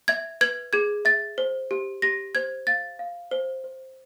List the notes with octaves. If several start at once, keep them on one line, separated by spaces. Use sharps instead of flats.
E5 G#6
B4 G#6
G#4 G#6
E5 A6
C5
G4
G4 A#6
C5 G#6
F5 A6
F5
C5
C5